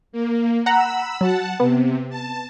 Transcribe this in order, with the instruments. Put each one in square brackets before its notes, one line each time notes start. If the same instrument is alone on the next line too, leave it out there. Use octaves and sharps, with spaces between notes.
[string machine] A#3
[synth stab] F#5 A#5 [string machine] B5 E6
[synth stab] F#3 [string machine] F#5 A5
[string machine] C3 [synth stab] B3
[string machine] A5